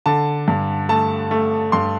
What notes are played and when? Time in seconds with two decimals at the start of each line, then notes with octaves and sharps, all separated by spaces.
0.06 D3 A5
0.48 G2
0.89 A3 A5
1.31 A3
1.72 G2 C6